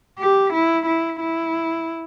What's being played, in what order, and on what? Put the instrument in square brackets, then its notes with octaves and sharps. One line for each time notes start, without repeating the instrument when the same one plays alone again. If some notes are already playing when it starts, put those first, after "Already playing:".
[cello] G4
E4
E4
E4